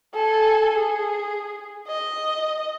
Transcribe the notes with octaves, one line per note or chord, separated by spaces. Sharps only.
A4 G#5
G#4
D#5